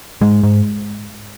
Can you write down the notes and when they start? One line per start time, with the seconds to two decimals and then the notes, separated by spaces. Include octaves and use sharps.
0.22 G#2 G#3
0.43 G#2